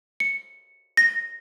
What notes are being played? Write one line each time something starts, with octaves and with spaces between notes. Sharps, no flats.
C#7
A#6